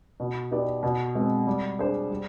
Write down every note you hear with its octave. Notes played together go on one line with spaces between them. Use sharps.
B2
B3 D#4 G4 D5
B2
G#3 C4
G3
D4 G#4 C5
G3